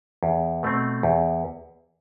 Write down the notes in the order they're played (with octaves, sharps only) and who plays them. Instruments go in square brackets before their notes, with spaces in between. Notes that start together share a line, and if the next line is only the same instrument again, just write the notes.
[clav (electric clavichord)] E2
B2 A3 C4
E2